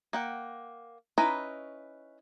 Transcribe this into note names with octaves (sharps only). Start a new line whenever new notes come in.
A#3 F#5 G5
C#4 D#4 E4 B4 A#5